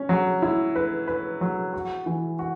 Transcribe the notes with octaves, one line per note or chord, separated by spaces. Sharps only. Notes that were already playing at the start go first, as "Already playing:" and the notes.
Already playing: C#4
F#3
E4
B4
B4
F#3
F#4
E3
F#4